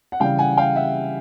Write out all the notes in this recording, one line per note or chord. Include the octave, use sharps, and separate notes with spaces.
F#5
C#3 E3 G3 F5 G5
F#5 G#5
F5 G5
E5 F#5